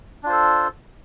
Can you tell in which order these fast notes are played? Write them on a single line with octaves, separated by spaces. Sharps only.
D4 F4 C5 A4